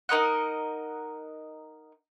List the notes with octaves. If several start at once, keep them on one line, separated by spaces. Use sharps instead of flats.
D#4 A#4 D#5 F#5